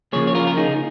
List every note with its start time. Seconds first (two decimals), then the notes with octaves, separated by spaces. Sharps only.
0.13 C#3 F3 A#3 G#4 C#5
0.27 C#5
0.35 F4 A#4
0.47 A#4
0.57 D#4 G#4